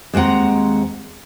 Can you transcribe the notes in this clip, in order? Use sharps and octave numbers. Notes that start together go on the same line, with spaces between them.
D#2 G#3 C4 F#5 A#5